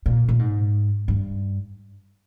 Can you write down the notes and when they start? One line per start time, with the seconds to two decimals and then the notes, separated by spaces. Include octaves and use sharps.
0.06 A#2
0.29 A#2
0.39 G#2
1.08 G2